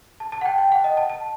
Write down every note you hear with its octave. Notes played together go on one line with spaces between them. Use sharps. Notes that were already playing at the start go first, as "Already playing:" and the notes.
A5
A5
F#5
G5
G5
F#5
D#5
A5
A5